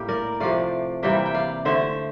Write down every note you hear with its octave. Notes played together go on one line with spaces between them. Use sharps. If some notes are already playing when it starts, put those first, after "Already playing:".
Already playing: A2 G3 A#3 G4
A#4 D5
C3 F3 A3 D5 F5
C3 E3 G3 A#3 E5 G5
G5
D5 F5
D3 A3 C5 E5